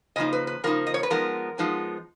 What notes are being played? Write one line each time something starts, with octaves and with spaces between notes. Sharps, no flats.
C#3 F3 A#3 D#4 D#5
B4
B4
C#3 F3 A#3 D#4 A#4
D#5
C#5
B4
F3 G#3 B3 D#4 A#4
F3 G#3 B3 D#4